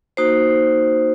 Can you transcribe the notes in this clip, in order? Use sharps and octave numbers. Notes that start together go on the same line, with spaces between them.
A#3 D#4 F#4 C5